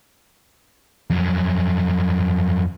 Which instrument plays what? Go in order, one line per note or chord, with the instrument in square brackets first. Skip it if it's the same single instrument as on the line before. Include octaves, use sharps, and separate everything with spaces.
[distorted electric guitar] F2 F#3